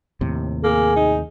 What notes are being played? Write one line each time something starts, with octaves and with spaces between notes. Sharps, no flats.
D#2 A2 C3
A#3 G#4
D#4